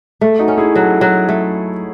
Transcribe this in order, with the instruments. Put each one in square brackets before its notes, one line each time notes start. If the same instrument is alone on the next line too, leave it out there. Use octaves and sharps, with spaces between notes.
[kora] A3
[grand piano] D#4 F#4
[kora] C#4
[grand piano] E4 G#4
[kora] F#3 [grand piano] F#4 A4
[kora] F#3
A3